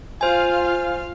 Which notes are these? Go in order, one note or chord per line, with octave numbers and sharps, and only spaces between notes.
F4 C5 F5 G#5